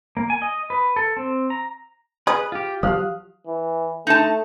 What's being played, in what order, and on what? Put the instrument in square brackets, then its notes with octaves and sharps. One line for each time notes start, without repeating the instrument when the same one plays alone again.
[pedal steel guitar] A#3
G#5
D#5
B4
A4
C4
A#5
[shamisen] G#4 D#5 [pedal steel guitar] B4
[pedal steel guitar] F4 G4
[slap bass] F3 F#3 [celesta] G4 F5 [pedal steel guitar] D#6 F6 F#6
[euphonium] E3
[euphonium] A3 [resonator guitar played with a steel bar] D#4 A5